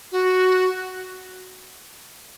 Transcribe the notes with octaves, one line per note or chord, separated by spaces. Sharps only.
F#4